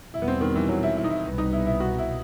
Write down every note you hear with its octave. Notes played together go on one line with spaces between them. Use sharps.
E2 B2 G3 E4
B3
C4
D#3
E3
F#3
E4
E4
D#4
E4
C2 B2 G3 B3
D#4
E4
E4
F#4
E4